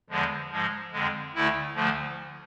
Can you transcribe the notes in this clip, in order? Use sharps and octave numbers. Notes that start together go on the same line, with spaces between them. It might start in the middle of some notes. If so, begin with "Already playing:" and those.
E2 D3 F3 G#3
G#2 F3 G#3
F2 D3 G#3
D2 D3 A3 E4
D2 D3 F3 A3